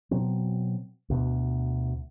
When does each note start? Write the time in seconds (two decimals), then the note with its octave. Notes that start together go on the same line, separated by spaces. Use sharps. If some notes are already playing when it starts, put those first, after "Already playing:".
0.11 B2 F#3 C4
1.10 D2 B2